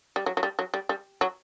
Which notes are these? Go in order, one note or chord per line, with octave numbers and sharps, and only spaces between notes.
G3
F#3
F#3
G3
F#3
G3
G3
F#3